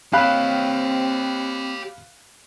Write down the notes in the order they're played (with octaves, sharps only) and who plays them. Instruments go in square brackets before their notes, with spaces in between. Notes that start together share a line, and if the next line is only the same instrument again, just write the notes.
[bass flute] C4 [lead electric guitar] G4 C#5 [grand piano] F5 B5 F#6